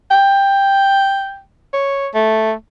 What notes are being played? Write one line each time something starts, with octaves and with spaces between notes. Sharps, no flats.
G5
C#5
A3